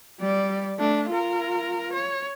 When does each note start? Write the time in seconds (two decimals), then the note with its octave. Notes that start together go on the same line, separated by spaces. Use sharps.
0.20 G3 D5
0.78 A3 D4
1.09 F4 A#4
1.92 C#5